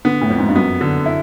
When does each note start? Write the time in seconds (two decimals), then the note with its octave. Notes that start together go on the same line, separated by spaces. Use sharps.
0.05 D3 B3
0.21 A2
0.30 F2
0.38 G#2
0.48 G2
0.55 F#2 B3
0.81 D3
1.06 E4